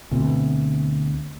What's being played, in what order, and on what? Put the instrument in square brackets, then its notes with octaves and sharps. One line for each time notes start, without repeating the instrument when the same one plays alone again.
[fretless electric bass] D2 B2 C4